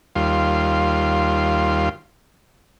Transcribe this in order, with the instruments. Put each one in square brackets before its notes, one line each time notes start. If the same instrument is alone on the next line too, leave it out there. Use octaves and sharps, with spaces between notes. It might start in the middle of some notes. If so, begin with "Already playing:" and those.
[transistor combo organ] D#2 G3 F4 F5 C6